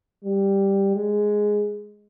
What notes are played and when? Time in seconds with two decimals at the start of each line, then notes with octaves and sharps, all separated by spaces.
0.24 G3
0.95 G#3